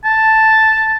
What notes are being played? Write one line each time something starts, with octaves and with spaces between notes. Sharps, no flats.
A5